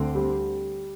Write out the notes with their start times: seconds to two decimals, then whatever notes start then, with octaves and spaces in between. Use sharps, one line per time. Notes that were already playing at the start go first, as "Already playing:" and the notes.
Already playing: D2 D3 C4
0.15 G3